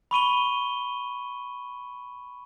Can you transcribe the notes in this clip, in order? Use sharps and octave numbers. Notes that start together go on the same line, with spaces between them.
B5 C#6 D#7 G7